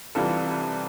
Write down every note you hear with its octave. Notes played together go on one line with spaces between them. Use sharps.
C2 C3 E3 G3 F4 A4